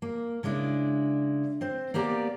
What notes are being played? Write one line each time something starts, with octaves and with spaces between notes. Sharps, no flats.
A#3
C#3 G#3 D4 E4 D5
C4 C5
A#3 B3 G4 D5 G#5 A#5